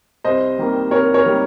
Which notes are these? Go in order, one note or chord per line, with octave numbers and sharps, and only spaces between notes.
C2 C5 D#5
C3 D#3 G3 A#3
C2 A#4 C#5
A#4 C#5
C3 D#3 G3 A#3